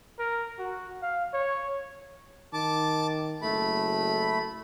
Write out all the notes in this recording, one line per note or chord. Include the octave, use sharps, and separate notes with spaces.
A#4
F#4
F5
C#5
D#3 A5 D6
F#1 A3 B5